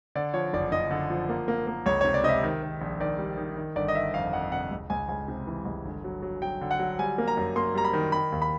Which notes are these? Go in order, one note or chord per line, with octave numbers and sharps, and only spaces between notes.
D3 D5
F3 C#5
F#1 D5
F#1 D#5
D3
F3
A#3
A#3
A#3
C#2 C#5
C3 C#5
D5
C3 D#5 E5
D#3
D#3
A#1
D#3 D5
G3
D#3
D#3
G1 D5
D#5
D#3 E5
F2 F5
F2 F#5
C3 F#5
C#2
C#2 G#5
C#2 G#5
C3
E3
C#2
G1
F#3
F#3
F#3 G5
D3
F#5
F#3
G3 G#5
A#3
A#5
F#2
A#3 C6
G3 A#5
B5
D#3
D#3 B5
D#2
B5